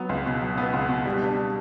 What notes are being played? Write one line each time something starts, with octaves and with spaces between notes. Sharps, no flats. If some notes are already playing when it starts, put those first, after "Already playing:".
Already playing: F#3 B3
C#2
B2
F#3
B3
C#2
B2
G3
D4